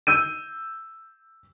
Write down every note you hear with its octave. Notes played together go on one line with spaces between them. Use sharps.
E6 G6 D#7